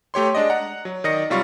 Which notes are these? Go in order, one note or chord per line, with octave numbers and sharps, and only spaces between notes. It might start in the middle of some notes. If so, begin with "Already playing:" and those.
A3 G4 C#5 C6
G#3 D4 D5 D#5
F#5 A#5
F#3
D#3 D5 D#5 D#6 A#6 C#7
C3 F#3 G3 F4 F5 C#6